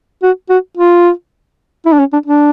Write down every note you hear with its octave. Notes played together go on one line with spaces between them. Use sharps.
F#4
F#4
F4
E4
D4
C#4
D4
D4